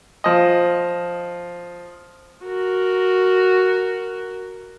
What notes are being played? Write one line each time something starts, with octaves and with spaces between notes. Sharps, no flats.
F3 D#5
F#4 A#4